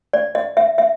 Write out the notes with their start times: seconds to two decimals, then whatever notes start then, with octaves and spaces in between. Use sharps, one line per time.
0.13 D5
0.35 D#5
0.57 E5
0.78 E5